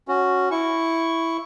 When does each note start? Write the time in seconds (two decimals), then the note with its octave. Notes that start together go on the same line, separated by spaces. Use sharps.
0.08 C#4 F#4
0.51 E4 C#6